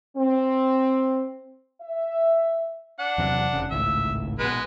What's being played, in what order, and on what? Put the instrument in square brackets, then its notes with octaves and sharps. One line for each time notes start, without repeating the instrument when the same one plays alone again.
[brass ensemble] C4
E5
[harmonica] D4 F#5
[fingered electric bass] E2 C3 F#3
F1 C#3
[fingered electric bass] G#1 C#2 A2 [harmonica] E5
[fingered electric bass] A#1 B2 [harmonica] G#3 B4